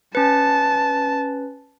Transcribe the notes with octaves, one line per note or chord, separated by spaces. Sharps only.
C#4 B4 A5